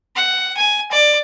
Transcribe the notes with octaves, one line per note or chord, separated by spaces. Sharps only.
F#5
G#5
D5